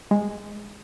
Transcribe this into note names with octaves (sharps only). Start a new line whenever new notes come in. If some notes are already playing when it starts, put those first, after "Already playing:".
G#3